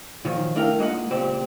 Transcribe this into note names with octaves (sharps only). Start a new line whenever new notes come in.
A#2 D#3 F3 F#3
A3 D4 E4 A#4 F5 G5
G#3 A#3 D#4 F4 F#5
C#2 A#2 C4 G4 G5